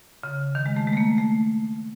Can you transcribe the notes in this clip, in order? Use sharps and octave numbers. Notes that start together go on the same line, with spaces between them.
C#3
D#3
G#3
A3
G#3
A3
A#3
A3